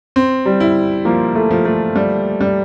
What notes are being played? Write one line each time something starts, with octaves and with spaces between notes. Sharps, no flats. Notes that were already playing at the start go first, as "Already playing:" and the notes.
C4
G3
E4
F3 A#3
A3
F3
A3
G3
G3